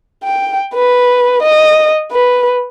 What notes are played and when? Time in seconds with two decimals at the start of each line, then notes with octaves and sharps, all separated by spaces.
0.24 G5
0.74 B4
1.42 D#5
2.11 B4